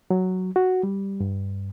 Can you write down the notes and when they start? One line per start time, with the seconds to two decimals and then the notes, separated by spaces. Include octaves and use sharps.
0.11 F#3
0.56 F#4
0.83 G3
1.20 G2